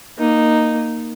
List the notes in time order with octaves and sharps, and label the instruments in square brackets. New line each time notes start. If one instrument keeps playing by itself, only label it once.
[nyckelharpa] A#3 D#4